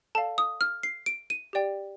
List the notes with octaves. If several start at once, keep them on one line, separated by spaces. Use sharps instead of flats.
A4 D5 F5 A5
D#6
F6
C7
D7
D#7
G4 D5 G5